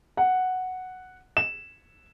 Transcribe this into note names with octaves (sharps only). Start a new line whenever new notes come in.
F#5
E7